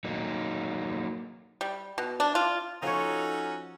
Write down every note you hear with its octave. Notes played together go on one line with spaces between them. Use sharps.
F#3 A#3 D#4
G3
B2
D4
F4
F3 C#4 D#4 F#4 A4 C#5